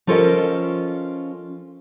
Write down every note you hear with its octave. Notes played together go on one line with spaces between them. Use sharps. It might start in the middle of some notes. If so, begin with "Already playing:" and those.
F3 C#4 F4 A4 A#4 D#5